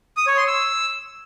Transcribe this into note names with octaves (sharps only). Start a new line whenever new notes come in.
D#6
C#5
C6
E6